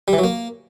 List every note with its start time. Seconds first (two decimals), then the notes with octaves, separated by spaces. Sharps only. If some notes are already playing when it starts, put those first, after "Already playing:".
0.08 G3
0.13 E3
0.18 F#3
0.24 A#3